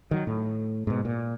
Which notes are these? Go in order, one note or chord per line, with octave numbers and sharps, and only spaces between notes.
D#3 F#3
A2
G#2 B2
A#2